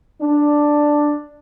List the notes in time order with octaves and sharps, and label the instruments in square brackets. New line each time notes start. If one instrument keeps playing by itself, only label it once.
[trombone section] D4